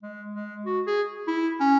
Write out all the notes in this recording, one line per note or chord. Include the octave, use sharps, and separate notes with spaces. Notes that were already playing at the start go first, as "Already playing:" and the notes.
G#3
G#3
F#4
G#4
E4
C#4